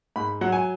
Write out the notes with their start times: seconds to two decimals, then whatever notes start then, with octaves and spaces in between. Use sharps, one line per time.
0.16 G#2 B5
0.41 F#3 F#5
0.52 G#5